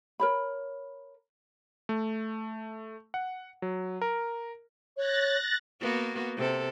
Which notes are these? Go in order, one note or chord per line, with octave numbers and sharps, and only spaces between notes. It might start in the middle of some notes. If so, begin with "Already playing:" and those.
A#4 C#5 B5
A3
F#5
F#3
A#4
C#5 F#6 A6 A#6
A#3 B3 F#4
C3 A4